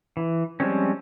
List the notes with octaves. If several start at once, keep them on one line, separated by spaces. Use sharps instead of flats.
E3
F3 G3 G#3 C4 C#4